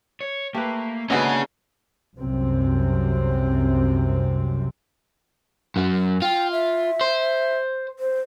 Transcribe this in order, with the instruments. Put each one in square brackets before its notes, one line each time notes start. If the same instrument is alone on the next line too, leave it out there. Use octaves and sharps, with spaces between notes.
[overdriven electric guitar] C#5
[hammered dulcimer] A3 [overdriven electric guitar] A#3 [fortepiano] G4 B4
[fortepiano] G#1 F#4 B4 [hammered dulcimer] D3 B3 [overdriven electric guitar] A#3 [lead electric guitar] C#4 G#4
[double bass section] C2 F#2 C3 C4
[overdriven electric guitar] F#2 F#3
[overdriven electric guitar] F4 [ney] G5
[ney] E5
[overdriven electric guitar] C5
[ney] C5